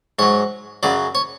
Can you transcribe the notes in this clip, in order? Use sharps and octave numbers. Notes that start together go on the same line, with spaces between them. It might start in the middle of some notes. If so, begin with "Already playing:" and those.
G#2 F#3 C#5
F#2 C#3 F#3 D5
C#5